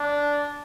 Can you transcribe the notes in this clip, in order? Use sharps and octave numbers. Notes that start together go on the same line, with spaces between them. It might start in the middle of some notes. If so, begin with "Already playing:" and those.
Already playing: D4